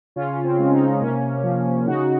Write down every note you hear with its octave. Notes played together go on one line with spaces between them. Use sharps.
C#3 C#4 F4
C4
G#3
C4 D#4
C3 A#3 C#4
F3 A#3
C#3 D#4 F#4